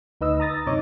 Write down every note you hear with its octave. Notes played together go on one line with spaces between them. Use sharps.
D2 D#4 B4 D#5 E6
A#5 D#6 A6 A#6
F#2 C3 D#4 C#5 D6